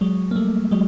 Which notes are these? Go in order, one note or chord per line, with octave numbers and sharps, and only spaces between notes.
F#3 G#3
A#3
G3 A3
F#3 G#3